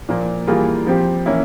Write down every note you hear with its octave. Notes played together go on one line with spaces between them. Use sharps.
A#2 F3 A#3
E3 G3 A#3 F4 G#4
F3 C4 G4
E3 A#3 C#4 E4